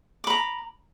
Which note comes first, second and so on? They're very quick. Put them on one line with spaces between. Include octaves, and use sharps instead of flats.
D6 B5 A#5